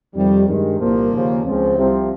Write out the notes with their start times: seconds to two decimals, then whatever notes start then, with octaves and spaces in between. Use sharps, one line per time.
0.14 F2 C3 D#3 G3
0.46 G2 D#3 G#3
0.79 C2 A#2 F3 A#3
1.12 D#2 C#3 F3
1.43 C#2 C#3 F3 C4
1.77 C2 C3 F3